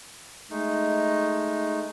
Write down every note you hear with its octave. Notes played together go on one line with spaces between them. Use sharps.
G#3 A3 D#4